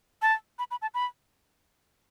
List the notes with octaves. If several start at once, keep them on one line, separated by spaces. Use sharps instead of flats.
A5
B5
B5
A5
B5